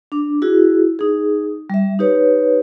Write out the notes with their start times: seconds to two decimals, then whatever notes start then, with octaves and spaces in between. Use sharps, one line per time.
0.12 D4 D6
0.42 E4 F#4 G#4
0.99 D#4 G#4
1.70 G3 E5
1.99 D#4 G4 B4 C#5